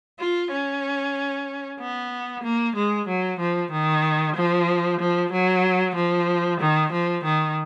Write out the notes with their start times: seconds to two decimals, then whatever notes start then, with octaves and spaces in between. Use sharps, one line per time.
0.19 F4
0.51 C#4
1.79 B3
2.43 A#3
2.76 G#3
3.08 F#3
3.39 F3
3.72 D#3
4.36 F3
5.00 F3
5.32 F#3
5.96 F3
6.60 D#3
6.92 F3
7.24 D#3